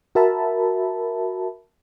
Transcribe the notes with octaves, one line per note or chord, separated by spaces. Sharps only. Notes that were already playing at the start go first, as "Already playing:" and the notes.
F#4 A#4 E5 A5 B5